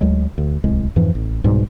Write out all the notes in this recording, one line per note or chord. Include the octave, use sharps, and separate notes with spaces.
D2 F#3 G#3
D2
D1 C2 G#3
F2 G#2 E3 F3
A1
C2 G#2 B2 G3